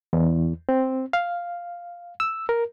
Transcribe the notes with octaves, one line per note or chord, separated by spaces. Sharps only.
E2
C4
F5
E6
A#4